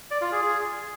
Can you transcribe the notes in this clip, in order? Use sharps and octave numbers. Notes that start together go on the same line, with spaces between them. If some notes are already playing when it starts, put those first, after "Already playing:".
D5
F4
G#4
G#4